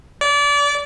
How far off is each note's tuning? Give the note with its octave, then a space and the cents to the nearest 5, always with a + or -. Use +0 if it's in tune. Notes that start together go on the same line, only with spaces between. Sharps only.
D5 -30